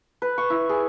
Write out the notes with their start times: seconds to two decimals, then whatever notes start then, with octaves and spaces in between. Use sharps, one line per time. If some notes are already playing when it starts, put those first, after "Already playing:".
0.22 B4
0.38 C#6
0.50 E4
0.69 G#4